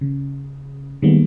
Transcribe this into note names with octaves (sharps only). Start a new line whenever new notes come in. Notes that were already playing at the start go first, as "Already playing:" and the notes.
C#3
D#3 G3 G#3 A#3 B3